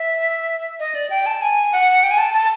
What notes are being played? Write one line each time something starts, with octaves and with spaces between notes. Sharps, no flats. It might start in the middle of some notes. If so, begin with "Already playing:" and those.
Already playing: E5
D#5
D5
G5
A5
G#5
F#5
G5
G#5
A5
A5